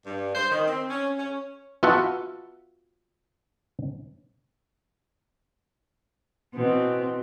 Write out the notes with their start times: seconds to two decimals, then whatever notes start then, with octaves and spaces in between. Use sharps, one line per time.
0.06 G2
0.35 C5
0.51 D#3
0.68 C4
0.90 C#4
1.18 C#4
1.83 B3 F4 F#4 E5 F#5 A5
6.54 B2 E3 C4